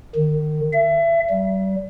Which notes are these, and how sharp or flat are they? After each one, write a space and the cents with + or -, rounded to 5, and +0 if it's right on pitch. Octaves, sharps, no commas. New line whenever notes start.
D#3 -30
E5 +30
G3 -35